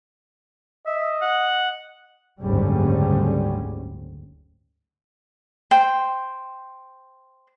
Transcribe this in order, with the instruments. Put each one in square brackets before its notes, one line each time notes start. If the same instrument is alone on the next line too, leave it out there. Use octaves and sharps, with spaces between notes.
[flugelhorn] D#5 [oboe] E5
[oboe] F#5
[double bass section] F#1 D2 G#2 G3 C#4
[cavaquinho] C5 G5